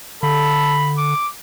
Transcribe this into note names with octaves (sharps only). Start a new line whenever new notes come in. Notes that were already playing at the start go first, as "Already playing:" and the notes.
D3 A4 B5
D6